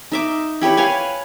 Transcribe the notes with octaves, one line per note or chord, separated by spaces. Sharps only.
D#4 E5 D6
E4 G4 B4 C#5
B4 C#5 F5 G#5